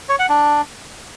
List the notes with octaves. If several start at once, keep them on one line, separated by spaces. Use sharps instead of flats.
C#5
F#5
D4